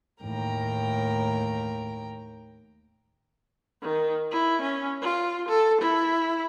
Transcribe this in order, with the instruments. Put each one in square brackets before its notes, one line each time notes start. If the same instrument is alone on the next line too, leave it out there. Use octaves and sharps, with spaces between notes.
[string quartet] D#2 A2 A#4 G5 A#5
[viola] D#3
E4
C#4
F4
A4
E4